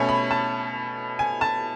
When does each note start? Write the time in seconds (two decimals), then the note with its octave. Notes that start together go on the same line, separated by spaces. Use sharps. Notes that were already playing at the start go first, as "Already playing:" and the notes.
Already playing: B2 A3 C#4 G#5
0.09 B5
0.31 A5
1.19 G#5
1.41 A5